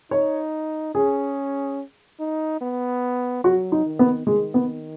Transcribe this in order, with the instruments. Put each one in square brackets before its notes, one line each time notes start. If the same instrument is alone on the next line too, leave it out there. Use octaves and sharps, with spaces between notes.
[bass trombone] D#4 [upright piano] C#5
[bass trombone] C#4 [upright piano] G#4
[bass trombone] D#4
B3
[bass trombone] F#3 [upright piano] F#4
[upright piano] D#4
[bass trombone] D#3
[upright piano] B3
[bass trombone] D#3 [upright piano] G#3
[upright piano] B3